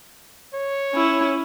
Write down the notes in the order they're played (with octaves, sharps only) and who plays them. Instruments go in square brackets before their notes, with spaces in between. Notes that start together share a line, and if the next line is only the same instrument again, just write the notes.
[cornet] C#5
[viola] C#4 E4